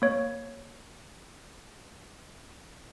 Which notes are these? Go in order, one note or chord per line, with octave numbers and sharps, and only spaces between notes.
A#3 C#5